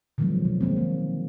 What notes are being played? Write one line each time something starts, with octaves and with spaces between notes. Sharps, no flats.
D3 D#3 F3 F#3 G#3 B3
B2 D#3
D#3 G#3 A#3 C4
D#3 G#3